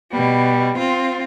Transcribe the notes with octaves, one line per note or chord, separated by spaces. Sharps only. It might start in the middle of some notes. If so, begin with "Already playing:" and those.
B2 G3
C4 F4